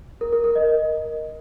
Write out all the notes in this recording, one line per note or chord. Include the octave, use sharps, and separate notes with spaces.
A#4
A#4
A#4
D#5
D#5